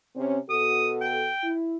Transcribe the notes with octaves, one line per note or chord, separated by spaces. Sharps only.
C3 C4 C#4
B2 F#4 A4 D#6
G5
E4